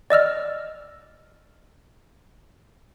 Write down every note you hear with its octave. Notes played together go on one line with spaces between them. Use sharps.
D5 D#5 E6 F6